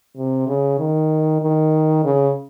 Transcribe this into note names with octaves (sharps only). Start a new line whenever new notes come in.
C3
C#3
D#3
D#3
C#3